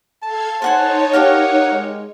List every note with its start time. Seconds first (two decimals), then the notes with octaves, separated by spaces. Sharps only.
0.23 A4 F5 A5 G#6
0.62 D#4 A4 C5 C#5 F#5 G#5
1.13 G4 A#4 F5 F#5
1.72 G#3